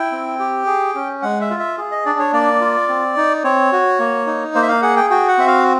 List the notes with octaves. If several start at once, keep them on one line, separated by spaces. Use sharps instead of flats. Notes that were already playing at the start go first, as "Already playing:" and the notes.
Already playing: E4 G5
C4
G4
G#4
C#4
G#3 F#5
E5
F4
E5
G#4
D#5
D4 D5
C#5
A#3 D5
F4
C4
D#4
C4 C#5
F#4
A#3
D#4
A#3 C5
E5
F5
G#4 F#5
G5
F#4 G5
F#5
C4 E5
F5